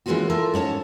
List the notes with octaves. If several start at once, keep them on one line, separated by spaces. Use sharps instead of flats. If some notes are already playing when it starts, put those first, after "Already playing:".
E3 G#3 A#3 C#4 F4 F#4
F4 A4 A#4 E5
G#2 C#4 C#5 A5